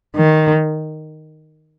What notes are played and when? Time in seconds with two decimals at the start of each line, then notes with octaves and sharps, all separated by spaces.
0.16 D#3